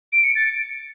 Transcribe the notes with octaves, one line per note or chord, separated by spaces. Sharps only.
D7
C#7
A6